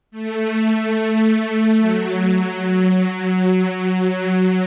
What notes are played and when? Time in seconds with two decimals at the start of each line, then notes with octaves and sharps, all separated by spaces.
0.11 A3
1.80 F#3
3.47 F#3